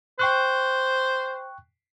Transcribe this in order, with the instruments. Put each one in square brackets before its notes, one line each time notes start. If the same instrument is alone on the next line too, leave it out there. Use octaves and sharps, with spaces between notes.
[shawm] C5 [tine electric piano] G5 C#6 F#6